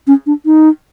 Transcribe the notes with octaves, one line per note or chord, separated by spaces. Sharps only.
C#4
D4
D#4